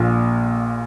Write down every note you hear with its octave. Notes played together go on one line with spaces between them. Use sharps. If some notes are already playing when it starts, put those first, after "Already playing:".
Already playing: A#1 A#2